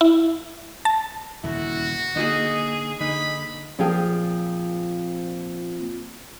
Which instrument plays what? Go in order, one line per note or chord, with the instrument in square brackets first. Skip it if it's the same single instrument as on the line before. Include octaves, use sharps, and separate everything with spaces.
[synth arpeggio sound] E4
A5
[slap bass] D#1 D2 C#3 [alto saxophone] E4 [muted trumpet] F#4
[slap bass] D3 [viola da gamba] A#3 G#4 [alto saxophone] D#4
[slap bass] D3 [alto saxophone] D#4 [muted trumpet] B5
[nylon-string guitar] A#2 F3 C4 G#4 F5 G5